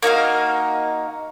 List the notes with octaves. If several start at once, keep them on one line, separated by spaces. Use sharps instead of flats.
A#3 D#4 F#4 F5